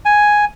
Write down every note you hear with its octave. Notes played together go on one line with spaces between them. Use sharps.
G#5